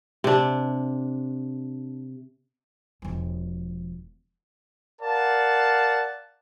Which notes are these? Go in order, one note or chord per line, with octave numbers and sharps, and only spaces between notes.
C3 D4
E1 F3
A#4 D5 F5 F#5 A5